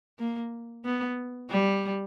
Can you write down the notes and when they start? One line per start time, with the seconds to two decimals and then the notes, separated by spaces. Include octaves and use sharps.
0.19 A#3
0.85 B3
1.50 G3